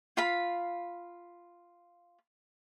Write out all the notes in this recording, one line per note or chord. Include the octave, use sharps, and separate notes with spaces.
F4 F5 B5